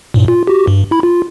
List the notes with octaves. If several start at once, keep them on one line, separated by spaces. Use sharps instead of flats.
G2 A#2
F4
F#4 G4
G2
E4 B5
F4